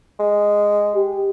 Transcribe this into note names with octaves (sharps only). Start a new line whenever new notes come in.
G#3
G4